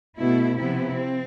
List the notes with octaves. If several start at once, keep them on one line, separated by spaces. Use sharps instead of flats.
B2 A3 E4
C3 F3 B3 E4
C4